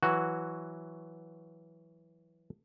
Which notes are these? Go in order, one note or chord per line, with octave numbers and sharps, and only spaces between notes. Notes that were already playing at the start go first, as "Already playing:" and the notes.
E3 F#3 F#4